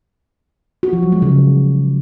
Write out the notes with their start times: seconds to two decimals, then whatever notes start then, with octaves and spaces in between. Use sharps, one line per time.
0.83 F#4
0.93 F3
1.03 F#3
1.12 G#3
1.22 C#3